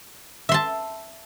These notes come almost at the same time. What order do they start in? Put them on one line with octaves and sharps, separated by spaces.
E5 C6 A5